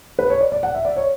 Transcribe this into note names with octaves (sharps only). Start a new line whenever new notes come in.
B4
C#5
D5
D5
F#5
E5
D5
C#5